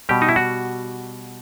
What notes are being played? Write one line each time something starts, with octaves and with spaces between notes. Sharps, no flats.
B2 G3 G4
D#4
E4
F#4